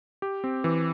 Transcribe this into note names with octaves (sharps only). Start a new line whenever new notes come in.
G4
C4
E3